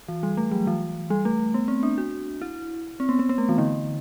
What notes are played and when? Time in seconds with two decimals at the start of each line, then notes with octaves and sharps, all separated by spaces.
0.08 E3
0.23 G3
0.37 A3
0.51 F#3
0.67 E3
1.10 G3
1.25 A3
1.54 B3
1.68 C4
1.83 D4
1.98 F#4
2.42 E4
3.00 C4
3.09 B3
3.19 B3
3.29 B3
3.38 A3
3.49 E3
3.58 D3